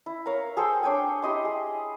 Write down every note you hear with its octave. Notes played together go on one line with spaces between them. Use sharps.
E4
A#4 C#5 F5 A#5
G#4 A4 C5 G5
D4 C#5 G5 G#5
E4 G4 D#5 C6
G#4